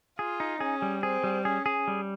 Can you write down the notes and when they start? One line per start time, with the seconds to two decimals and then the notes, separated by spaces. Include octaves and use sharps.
0.19 F4 G#4
0.40 D#4
0.61 C#4 G#4
0.82 G3
1.03 C4 G#4
1.24 G3
1.45 C#4 G#4
1.66 G#4
1.88 G3